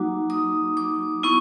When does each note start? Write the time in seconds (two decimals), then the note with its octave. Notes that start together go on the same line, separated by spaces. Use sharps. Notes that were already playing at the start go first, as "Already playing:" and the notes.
Already playing: F#3 A#3 D#4 F#4 D6
0.30 D#6
0.77 D6
1.23 B3 E4 C#6